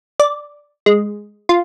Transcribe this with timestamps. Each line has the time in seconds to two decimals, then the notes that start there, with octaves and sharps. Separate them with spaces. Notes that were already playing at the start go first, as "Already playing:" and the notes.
0.20 D5
0.86 G#3
1.49 F4